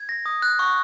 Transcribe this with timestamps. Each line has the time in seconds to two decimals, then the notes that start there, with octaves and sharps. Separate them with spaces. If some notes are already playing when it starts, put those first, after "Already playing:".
Already playing: G#6
0.09 A#6
0.26 D#6
0.42 F#6
0.59 C#6